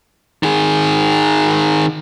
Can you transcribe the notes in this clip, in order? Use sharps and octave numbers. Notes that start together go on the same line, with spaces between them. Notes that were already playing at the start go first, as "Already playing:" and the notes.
D#3 G#4